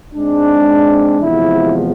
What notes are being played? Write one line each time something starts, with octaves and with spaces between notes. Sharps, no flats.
G#2 G#3 C4 D4
E2 C3 F3 G#3 B3 E4